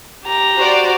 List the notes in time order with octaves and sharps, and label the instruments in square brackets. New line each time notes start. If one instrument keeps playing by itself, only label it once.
[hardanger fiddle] G4 A#5
[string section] F#4 C5 D5